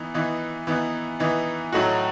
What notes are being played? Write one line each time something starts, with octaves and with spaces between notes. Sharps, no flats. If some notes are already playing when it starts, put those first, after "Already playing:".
Already playing: E3 B3 D#4
E3 B3 D#4
E3 B3 D#4
E3 B3 D#4
A2 F#3 A3 D#4 F#4